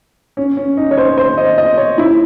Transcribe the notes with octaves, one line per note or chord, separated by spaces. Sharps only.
C#4
C#4
D#4
C#5
C5
C5
D#5
D#5
C#5
E4